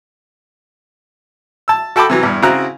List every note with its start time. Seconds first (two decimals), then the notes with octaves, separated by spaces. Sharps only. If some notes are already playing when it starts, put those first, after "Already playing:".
1.68 A5 E6
1.96 F#4 A4 G5 A5 B5 D6
2.10 C3 E3 F#3
2.23 E2 G2
2.42 C#3 C4 E4 F#4 A#5 F#6